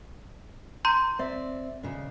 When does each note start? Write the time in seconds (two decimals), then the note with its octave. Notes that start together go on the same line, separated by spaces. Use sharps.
0.85 A#5 C6 G6
1.19 C4 D5 E5
1.83 D#2 C#3 D4